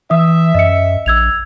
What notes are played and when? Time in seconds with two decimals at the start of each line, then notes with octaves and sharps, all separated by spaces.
0.11 E3 E5 D#6
0.55 F#2 D#5 C#7
1.06 A#1 E6 G#6 F7